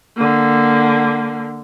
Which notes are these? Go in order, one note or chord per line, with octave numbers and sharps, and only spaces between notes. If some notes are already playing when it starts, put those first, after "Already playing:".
D3 A#3